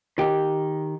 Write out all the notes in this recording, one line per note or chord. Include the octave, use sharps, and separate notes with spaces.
D#3 G4